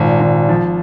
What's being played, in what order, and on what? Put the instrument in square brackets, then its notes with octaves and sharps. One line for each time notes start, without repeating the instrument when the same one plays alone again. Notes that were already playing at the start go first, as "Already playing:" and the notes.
Already playing: [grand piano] G#1 [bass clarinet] A#2
[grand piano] G#1
F3